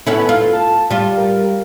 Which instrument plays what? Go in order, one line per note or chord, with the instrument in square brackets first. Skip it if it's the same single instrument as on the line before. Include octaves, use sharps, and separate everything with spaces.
[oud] B3 C#4 E4 [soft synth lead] A4
[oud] F4
[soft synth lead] A5
[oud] G3 F4
[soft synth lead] A#4